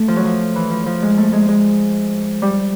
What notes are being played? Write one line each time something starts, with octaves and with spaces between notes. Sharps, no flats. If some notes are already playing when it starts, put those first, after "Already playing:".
Already playing: A3
F3
F#3
F3
E3
F3
F3
G#3
A3
G#3
G#3
G3